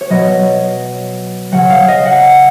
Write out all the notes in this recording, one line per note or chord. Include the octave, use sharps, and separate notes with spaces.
C#5
B2 F#3 D#5
C#3 F#3 F#5
F5
D#5
F#5